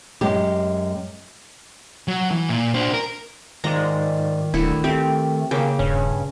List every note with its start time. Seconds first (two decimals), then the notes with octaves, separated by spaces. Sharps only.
0.21 F#2 G#3 G4
2.08 F#3
2.31 E3
2.49 A#2
2.74 D4 C5
2.94 A#4
3.64 G#2 D#3 G#3 F4 D5 A#5
4.54 D#1 D2 D3 E4 C#7
4.84 A3 C4 G4
5.51 C#3 A#3 C#4 G5
5.79 D#1 G2 C#4